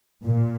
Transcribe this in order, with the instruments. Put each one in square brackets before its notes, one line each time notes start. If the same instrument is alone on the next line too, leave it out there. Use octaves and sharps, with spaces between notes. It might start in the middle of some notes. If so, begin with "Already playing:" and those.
[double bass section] A#2